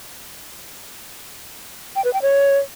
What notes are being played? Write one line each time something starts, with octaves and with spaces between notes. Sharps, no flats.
G5
B4
G5
C#5